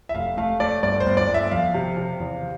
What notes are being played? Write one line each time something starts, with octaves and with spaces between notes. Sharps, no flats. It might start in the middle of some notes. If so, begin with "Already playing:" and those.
E5
F1 F5
A3 F5
A3 D5
G1 D5
C5
G1
D5
G1
E5
F2 F5
C3
C3
E2